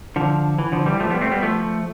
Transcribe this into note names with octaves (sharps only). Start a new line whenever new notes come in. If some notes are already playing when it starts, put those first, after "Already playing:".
D3 F3
E3
D3 F3
E3 G3
F3 A3
G3 B3
A3 C4
G3 B3
F3 A3